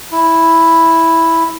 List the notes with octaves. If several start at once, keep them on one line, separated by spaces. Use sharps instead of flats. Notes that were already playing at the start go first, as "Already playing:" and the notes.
E4